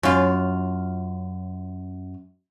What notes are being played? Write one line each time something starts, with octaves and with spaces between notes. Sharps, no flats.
F#2 F4